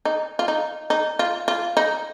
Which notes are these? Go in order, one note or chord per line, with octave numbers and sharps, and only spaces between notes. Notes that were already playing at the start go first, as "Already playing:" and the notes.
D#4
F4
D#4
D#4
F4
F4
D#4